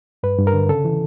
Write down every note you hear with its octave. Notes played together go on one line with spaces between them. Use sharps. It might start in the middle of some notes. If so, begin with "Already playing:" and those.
G2 B4
G2
A#4
D3
C#3 A4
E3